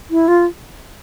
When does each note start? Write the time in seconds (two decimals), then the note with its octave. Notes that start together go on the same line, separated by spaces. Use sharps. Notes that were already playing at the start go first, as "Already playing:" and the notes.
0.11 E4
0.28 F4